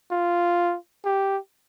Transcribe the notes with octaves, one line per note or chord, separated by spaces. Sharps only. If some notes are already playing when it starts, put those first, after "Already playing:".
F4
G4